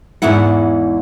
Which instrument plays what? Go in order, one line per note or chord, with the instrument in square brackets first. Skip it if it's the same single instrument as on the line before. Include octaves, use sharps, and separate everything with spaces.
[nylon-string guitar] E2 G#2 B3 E4 F#5